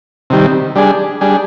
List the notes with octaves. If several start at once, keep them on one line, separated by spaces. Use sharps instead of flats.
C3 D#3 G3
G3 D4 G#4
G3 D4 G#4